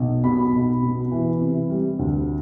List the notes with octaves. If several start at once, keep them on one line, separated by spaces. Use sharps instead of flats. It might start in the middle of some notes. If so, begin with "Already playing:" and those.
Already playing: B1
B2 B5
B1
B2
E3
C3
G3
D2